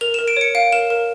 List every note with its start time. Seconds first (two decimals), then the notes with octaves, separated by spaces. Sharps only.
0.01 A#4 F7
0.14 A#4 E7
0.28 D7
0.37 C#5 C#7
0.55 F5 D7
0.73 A#4 E7
0.90 A#4